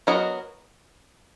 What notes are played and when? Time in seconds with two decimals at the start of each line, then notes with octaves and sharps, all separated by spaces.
0.07 F#3 B3 F#4 A#4 D#5